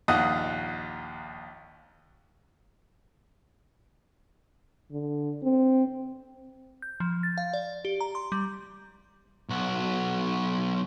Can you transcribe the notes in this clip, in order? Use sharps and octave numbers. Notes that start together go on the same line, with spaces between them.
A#1 D#2 F4 D#5 F#5 D#6
D3
C4
G6
F3
A6
F5
D5
G4
A#5
C6
G3
B1 F#4